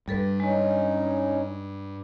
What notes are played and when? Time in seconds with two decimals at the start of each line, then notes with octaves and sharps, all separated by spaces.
0.08 G2 G3 A4 B4
0.40 G#3 C#4 D#4